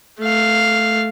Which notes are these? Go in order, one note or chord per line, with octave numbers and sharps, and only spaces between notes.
A3 F5